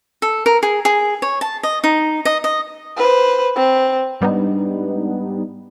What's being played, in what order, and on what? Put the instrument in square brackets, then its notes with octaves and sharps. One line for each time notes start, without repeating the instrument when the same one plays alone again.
[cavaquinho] A4
A#4
G#4
G#4
C#5
A5
D#5
D#4
D#5
D#5
[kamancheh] B4 C5
C4
[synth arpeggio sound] G#2 G3 B3 D4 D#4